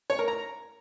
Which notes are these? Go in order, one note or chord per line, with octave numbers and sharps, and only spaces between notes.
C#5
A#4
A#5